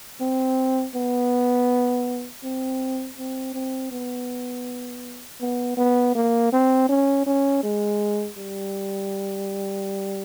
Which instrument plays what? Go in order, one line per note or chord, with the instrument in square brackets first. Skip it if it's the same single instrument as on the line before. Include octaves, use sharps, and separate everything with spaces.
[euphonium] C4
B3
C4
C4
C4
B3
B3
B3
A#3
C4
C#4
C#4
G#3
G3